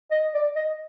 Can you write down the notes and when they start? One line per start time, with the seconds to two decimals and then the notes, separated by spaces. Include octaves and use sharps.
0.11 D#5
0.34 D5
0.56 D#5